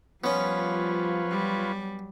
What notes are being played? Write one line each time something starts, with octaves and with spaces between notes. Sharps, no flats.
F3 G3 B3 C#4 F4 B4 C#5
F#3 G3